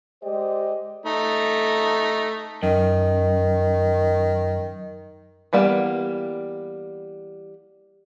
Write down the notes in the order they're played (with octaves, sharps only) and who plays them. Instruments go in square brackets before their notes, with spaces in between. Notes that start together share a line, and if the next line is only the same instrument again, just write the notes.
[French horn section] G#3 G4 C5 D5 D#5
[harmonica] A3 D#4
[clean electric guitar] F#2 [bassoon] D#3
[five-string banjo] E3 G3 A#3 B3